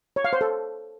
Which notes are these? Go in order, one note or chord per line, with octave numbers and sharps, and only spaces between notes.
C#5
F5
C5
A4